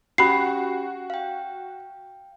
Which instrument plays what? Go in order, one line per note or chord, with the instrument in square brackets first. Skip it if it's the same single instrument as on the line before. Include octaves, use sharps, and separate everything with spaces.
[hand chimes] C#4 G4 G5 [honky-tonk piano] F#4 [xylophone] B5 C7
[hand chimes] F5 G5